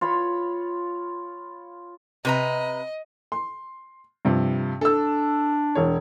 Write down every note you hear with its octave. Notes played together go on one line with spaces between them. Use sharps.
F4 C#5 B5
C3 B4 D#5 A#5
C6
G2 C3 F3
D4 A4 E6
E1 C#5